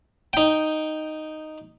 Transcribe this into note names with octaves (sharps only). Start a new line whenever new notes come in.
D#4 G5